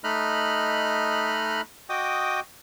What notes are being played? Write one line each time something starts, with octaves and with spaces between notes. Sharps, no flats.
A3 D#4 D#5 B5 F6 F#6
F#4 D#5 G5 D6 D#6